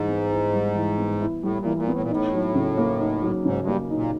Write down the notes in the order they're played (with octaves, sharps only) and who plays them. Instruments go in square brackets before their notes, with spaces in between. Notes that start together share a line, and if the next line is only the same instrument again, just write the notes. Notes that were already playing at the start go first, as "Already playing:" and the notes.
Already playing: [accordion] G#2 [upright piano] E3 G3
[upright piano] B3
E4
G3
E3
B3
E4
[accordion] A2 [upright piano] G3
[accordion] A#2
[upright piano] E3
[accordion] A#2
[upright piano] B3
[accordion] A2
A#2
[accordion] A2 [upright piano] D#4
[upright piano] F#3
C#3
A#3
D#4
F#3
[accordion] G#2 [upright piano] C#3
[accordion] G2
[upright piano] A#3
D#4
[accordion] A#2